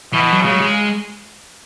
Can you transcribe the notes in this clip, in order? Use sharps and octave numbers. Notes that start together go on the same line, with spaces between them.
B2 E3
E3
F#3
C#3 G#3
F#3
G#3